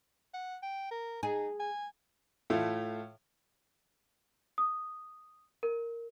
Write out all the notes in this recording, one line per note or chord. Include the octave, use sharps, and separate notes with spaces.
F#5
G5
A#4
D#4 G#4
G#5
A2 A3 F4
D#6
A#4